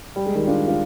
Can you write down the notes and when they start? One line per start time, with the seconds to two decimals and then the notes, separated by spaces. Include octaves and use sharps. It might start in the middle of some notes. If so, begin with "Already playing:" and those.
0.16 G3
0.26 G#3
0.35 D#3 G3
0.48 D4 F4
0.68 F4